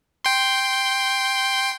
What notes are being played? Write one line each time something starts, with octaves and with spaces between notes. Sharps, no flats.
G5 C6